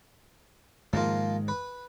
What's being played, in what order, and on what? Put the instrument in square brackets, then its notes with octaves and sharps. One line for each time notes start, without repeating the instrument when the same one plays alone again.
[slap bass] G#2 D#3 G#3 [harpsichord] F3 A#3 F4
[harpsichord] B4